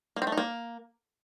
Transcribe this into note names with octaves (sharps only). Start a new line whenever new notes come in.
A#3
C4
A3
D#4
A#3